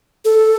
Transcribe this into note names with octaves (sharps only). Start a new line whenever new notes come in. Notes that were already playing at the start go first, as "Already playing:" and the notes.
A4